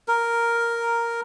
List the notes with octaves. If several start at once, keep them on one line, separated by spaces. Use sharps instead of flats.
A#4